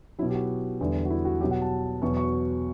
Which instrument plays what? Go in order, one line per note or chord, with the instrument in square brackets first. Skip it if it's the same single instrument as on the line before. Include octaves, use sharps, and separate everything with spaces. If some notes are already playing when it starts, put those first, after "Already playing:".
[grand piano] F#3 E4
B2
G4
F#4
E2 D3 G3
F#4
E4
F#4
B2 F#3 G4
F#5
A5
E2 B2 F#3 C#6
C#6